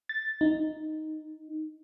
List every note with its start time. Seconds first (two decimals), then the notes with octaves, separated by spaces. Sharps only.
0.09 A6
0.41 D#4